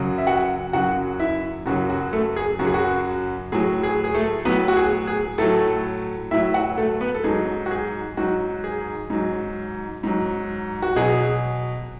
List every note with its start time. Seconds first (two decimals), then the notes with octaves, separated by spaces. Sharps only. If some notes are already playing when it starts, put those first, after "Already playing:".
Already playing: F#2 C#3 F#3
0.18 E5
0.27 F#4 F#5
0.73 F#2 C#3 F#3 F#4 F#5
1.20 E4 E5
1.66 F#2 C#3 F#3 F#4
1.90 F#4
2.13 A3 A4
2.36 G#4
2.59 F#2 C#3 F#3 F#4
2.67 G#4
2.74 F#4
3.52 A2 F#3 G#4
3.83 G#4
4.04 G#4
4.14 A3 A4
4.45 A2 F#3 B3 B4
4.68 F#4
4.77 G#4
5.07 G#4
5.38 A2 F#3 A3 A4
6.31 A2 F#3 E4 E5
6.54 F#4 F#5
6.78 A3 A4
7.01 B3 B4
7.14 A4
7.24 G#2 F#3 G#4
7.66 F#4
7.71 G#4
8.17 G#2 F#3 F#4
8.64 G#4
9.10 G#2 F#3
10.03 G#2 F#3
10.82 F#4
10.96 B2 F#3 G#4